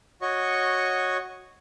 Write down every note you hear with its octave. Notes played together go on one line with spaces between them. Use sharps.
F#4 C#5 D#5 C#6